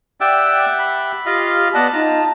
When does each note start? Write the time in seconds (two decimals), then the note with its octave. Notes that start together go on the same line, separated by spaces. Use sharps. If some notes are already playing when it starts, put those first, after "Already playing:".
0.21 G4 D5 E5 F#5 G5 E6
0.79 B5
1.26 F4 G4 D#5 F5
1.75 B3 D5 D#5 F#5 A5
1.93 D#4 F4 A#5